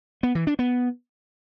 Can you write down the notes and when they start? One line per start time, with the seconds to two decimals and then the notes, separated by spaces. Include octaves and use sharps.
0.23 B3
0.35 E3
0.47 D4
0.59 B3